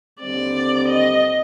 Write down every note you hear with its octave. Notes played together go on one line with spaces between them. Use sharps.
D#2 D3 G3 C4 D5
D#5